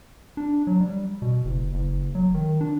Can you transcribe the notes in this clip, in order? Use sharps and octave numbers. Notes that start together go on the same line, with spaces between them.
D4
F#3
G3
B2
F#1
F#1
F#3
D#3
D4